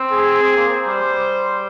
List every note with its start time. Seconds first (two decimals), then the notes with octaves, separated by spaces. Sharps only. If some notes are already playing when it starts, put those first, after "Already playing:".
Already playing: C4
0.12 G#4
0.42 C4
0.57 A#3
0.72 C5
0.87 G3
1.01 G3